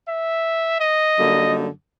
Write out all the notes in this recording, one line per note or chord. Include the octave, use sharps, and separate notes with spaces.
E5
D#5
F#2 D3 G3 A#3 D#4